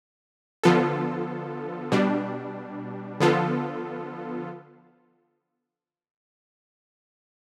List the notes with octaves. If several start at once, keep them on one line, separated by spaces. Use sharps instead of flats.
D3 F3 B3 F4 A4
B2 G3 D4
D3 F3 B3 F4 A4